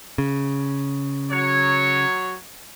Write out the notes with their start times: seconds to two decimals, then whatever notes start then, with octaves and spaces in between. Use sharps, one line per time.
0.18 C#3
1.30 F#3 C#5